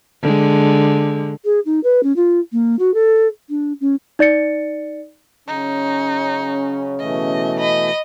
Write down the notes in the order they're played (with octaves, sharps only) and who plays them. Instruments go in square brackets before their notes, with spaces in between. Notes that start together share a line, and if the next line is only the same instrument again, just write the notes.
[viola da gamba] D3 G#3
[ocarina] G#4
D#4
B4
C#4
F4
A#3
F#4
A4
D4
C#4
[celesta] D#4 D5 A6 C#7
[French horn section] C#3 F#3 C#4 [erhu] D#4
[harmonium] B2 E3 A3 [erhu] D#5
[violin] D#5 [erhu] B5